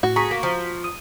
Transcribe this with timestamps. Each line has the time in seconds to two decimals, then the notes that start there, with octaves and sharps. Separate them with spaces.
0.03 A2 F#4
0.16 G#4 A#5 C#6 B6
0.31 A#3
0.43 F3
0.84 D#6